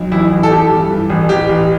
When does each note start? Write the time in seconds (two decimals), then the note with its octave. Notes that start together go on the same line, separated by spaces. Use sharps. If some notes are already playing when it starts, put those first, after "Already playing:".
Already playing: B1
0.11 A1 E4
0.31 A1
0.43 A4
0.50 E3 G4
0.70 G2
0.90 E3
1.10 A1
1.29 A1 G4
1.49 A1